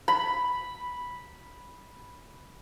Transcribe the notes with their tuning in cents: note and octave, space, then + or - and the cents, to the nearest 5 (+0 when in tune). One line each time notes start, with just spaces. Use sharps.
B5 -5